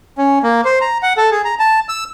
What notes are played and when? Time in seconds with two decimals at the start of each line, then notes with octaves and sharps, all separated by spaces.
0.18 C#4
0.43 A#3
0.65 C5
0.81 A#5
1.03 F#5
1.17 A4
1.31 G#4
1.45 A#5
1.59 A5
1.89 E6